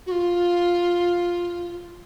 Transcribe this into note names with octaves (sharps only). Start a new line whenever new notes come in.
F#4
F4